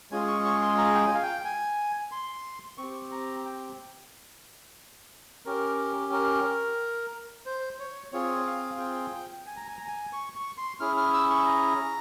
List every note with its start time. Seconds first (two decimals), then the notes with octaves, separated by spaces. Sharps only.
0.11 G#3 C#4 F4 G#4 G#5
0.28 C#6
0.45 C#6
0.62 C6
0.78 A#5
0.94 G5
1.01 G#5
1.15 F5
1.23 G5
1.45 G#5
2.12 C6
2.78 C4 C#6
2.83 G4
3.12 A#5
3.45 G5
5.45 C#4 G4 A#4
6.13 A#4
7.46 C5
7.79 C#5
8.12 C4 F4 G#4 C#5
8.47 F5
8.79 G5
9.47 G#5
9.57 A#5
9.67 G#5
9.77 A#5
9.88 G#5
10.13 C#6
10.36 C#6
10.58 C6
10.80 C#4 E4 G#4 F6
10.97 F6
11.14 E6
11.30 C#6
11.46 A#5